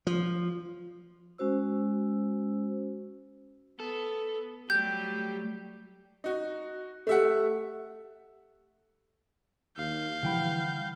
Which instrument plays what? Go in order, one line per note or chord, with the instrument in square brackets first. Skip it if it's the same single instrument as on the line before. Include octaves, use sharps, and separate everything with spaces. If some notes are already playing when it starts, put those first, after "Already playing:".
[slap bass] F3
[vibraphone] G#3 C#4 F#4 C5 E6
[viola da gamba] B3 [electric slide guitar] A4
[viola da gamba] F#3 G3 A3 [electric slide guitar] G4 [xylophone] G6
[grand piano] D#4 F#4
[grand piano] A3 E5 F#5 [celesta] G4 A4
[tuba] D#2 [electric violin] F5 G6
[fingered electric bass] D3 F3 G3 [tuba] E3 [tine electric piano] F#5 G5 B5